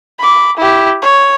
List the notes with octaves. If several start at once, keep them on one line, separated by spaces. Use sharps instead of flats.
B5 D6
E4 G4
C#5